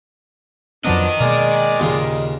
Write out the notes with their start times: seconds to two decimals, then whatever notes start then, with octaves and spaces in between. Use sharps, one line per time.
0.85 F2 F3 F#3 B3 C4 D4 A#4 D#5
1.20 B2 G#3 A#3 D5
1.80 D#2 A#2 C#3